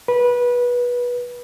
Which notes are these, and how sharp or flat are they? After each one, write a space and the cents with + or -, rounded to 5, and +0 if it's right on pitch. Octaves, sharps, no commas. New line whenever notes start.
B4 -20